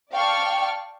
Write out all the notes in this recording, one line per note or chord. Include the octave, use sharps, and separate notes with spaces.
D5 F5 G5 A5 C#6 F6